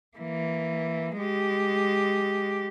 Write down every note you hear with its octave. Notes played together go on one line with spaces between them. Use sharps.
E3 A#3
G#3 G4